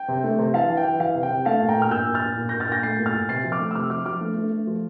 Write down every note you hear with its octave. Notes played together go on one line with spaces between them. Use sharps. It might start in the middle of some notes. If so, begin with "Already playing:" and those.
Already playing: G5
C3
A3
C3
E3 F5 A5
E3
G5
E3
E3 F5
C3
G5
C3
A3 F5 A5
A#2
G5 A#5
A#2 F6
A#2 E6 G6
A#2
F6 A6
A#2
A#2
A#2 G6 A#6
F6 A6
A#2 G6 A#6
A3 A6 C7
A#2
F6 A6
A#2
C3 A6 C7
F3
D6 F6
A3
E6
C3 D6 F6
F3 D6 F6
F3 D6 F6
A3
A3
A3
F3